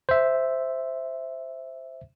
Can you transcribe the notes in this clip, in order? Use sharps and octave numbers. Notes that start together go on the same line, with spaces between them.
C5 E5